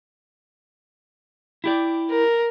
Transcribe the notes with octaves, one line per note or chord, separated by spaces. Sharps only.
E4 G4 D5
A#4